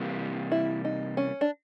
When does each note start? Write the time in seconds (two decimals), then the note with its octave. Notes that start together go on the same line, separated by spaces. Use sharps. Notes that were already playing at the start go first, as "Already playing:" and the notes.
Already playing: C3 E3 G3 A#3
0.52 E4
0.85 D#4
1.17 C#4
1.41 D4